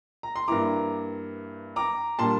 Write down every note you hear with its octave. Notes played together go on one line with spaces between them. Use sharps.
A#5
C6
G2 E3 A#3 E4 A#5 D6
A#5 D6
A#2 G3 D4 A5 C6